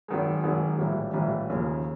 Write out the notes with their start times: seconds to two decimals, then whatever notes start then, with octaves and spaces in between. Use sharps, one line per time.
0.08 G#1 F#2 D#3 G#3
0.44 G#1 F#2 D#3 G#3
0.78 A#1 A2 E3 G3
1.14 A#1 A2 E3 G3
1.49 D#2 C#3 F3 A#3 C#4